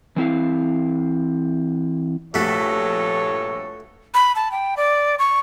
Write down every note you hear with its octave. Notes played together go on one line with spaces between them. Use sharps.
E3 C4 E4 F5
A#1 G2 C3 A3 F#4 A4 C#5 B6
B5
A5
G5
D5
C#6